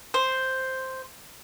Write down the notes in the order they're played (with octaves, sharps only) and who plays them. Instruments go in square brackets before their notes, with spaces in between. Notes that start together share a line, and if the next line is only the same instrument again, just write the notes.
[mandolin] C5